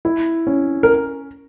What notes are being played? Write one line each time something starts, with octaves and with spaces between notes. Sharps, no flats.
E4
C#4
A#4